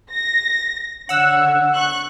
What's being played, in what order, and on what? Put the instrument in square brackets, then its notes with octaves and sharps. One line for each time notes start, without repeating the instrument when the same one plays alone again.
[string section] A#6
[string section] D3 C#5 [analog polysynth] F#5 E6
[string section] C#6 F#6